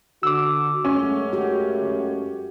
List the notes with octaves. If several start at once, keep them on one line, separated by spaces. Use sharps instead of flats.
D3 F#4 D6 E6
F#2 G#3 A3 C#4
F#4 G4